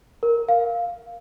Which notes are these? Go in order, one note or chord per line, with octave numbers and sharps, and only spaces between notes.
A#4
F5